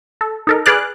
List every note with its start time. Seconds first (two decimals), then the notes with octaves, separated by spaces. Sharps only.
0.21 A4
0.47 D#4 A4 A#4
0.66 G#4 B4 D5 D6 F6 F#6